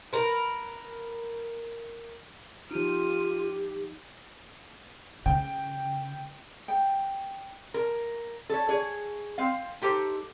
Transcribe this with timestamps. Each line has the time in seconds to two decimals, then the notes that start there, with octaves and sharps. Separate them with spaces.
0.13 A#4 B4
2.71 F3 D#4 F4 G4 F6 D#7
5.26 C#3 G5
6.68 G5
7.74 A#4
8.49 A4 C#5
8.69 G#4 C#5
9.38 C4 F5
9.82 D#4 G4 A4 C5